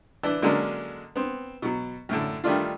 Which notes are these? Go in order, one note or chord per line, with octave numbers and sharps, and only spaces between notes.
E3 D4 E4
D3 F#3 G#3 A#3 C#4 D4
B3 C4
B2 F#3
F#2 A2 D3
D#3 G3 A3 D4 F4